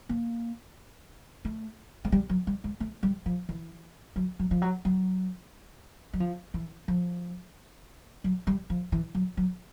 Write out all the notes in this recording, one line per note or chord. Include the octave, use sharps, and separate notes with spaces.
A#3
A3
G#3
G3
F#3
G3
G#3
A3
G3
F3
E3
F#3
F#3
F3
F#3
F#3
F#3
F3
E3
F3
F#3
G3
F3
E3
F#3
F#3